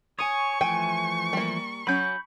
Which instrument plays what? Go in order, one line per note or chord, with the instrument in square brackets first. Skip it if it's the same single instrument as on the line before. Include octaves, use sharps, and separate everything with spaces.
[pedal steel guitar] C#5 [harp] G#5 D#6 [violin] C#6
[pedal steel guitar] E3 F3 A3 [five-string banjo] G5 [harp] G#5
[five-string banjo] G3 A#3
[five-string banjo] F#3 C#4 [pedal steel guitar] B5 G6